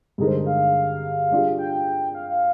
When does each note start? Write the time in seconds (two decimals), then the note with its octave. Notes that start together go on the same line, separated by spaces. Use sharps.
0.18 G2 D3 G#3 D#4 G#4 A#4
0.28 C5
0.46 F5
1.31 G3 D4 F4 G#4
1.58 G5
2.15 F5
2.29 F5